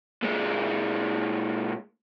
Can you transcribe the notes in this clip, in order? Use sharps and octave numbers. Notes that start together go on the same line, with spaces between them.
A#2 G#3